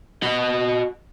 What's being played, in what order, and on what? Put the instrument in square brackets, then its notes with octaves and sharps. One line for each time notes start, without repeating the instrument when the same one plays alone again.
[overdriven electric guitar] F#4 D#5